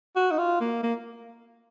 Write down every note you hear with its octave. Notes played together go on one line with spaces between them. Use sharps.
F#4
D#4
F4
A#3
A#3